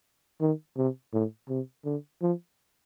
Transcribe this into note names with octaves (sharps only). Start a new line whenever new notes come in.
D#3
C3
A2
C3
D3
F3